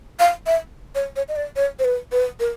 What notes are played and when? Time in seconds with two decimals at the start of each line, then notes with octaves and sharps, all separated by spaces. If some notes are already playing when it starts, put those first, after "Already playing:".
0.20 F5
0.46 E5
0.95 C#5
1.16 C#5
1.28 D#5
1.36 D5
1.56 C#5
1.79 C5
1.85 B4
2.12 B4
2.40 A#4